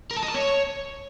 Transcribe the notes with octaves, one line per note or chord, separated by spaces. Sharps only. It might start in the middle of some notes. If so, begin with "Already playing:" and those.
A#4
A5
D#5
A5
C#5